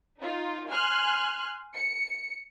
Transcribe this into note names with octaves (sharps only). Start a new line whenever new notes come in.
D#4 F4
G#5 C6 F6 F#6
C#7